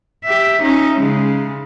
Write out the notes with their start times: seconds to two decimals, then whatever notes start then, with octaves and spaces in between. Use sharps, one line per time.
0.25 G4 E5
0.62 C#4 D#4
0.99 C#3 G#3